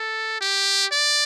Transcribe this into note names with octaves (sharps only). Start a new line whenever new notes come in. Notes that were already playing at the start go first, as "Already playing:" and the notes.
Already playing: A4
G4
D5